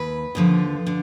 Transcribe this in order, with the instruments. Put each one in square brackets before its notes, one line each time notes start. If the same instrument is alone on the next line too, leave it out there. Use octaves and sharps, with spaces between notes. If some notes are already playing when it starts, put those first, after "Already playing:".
Already playing: [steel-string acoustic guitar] D#2 B4
D#2 D3 F3
D3